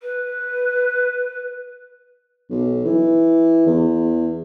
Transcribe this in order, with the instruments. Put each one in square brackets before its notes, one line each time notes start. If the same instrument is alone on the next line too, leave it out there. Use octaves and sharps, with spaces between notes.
[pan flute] B4
[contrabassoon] B1
E3
E2